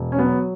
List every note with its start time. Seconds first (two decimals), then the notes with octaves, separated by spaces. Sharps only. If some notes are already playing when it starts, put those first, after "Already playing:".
Already playing: E1
0.12 C#4
0.18 F#3 B3